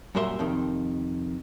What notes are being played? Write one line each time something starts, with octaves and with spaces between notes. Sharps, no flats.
F#2 A#2 G3 A#4 E5 C6
F2 C3 D#3